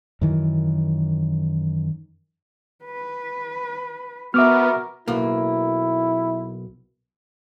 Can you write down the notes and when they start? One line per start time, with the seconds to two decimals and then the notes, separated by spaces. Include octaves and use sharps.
0.21 F#2 D#3 E3
2.85 B4
4.34 B3 F#4 A#4 E5 D6 F6
5.08 B1 A#3 E4